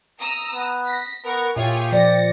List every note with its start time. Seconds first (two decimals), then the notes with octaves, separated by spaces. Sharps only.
0.19 A#5 D#6 E6
0.53 B3
0.86 A#6 B6
1.24 B3 A#4 A#5 C#6
1.56 A#2 F4 G4 G#4 C#5 E5
1.92 F3 C5 D5 A#6 C#7